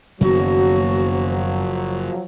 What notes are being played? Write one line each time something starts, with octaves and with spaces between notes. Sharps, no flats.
F#1 F#2 D#3 F3 F#3 B3 F#4